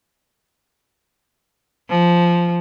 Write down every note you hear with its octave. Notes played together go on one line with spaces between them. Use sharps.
F3